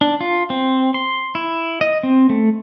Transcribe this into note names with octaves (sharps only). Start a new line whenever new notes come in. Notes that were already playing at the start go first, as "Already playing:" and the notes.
D4
F4
C4
C6
E4
D#5
C4
A3